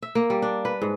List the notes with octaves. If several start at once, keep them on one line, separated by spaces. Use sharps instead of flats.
E5
A#3
G3
D4
B4
G#2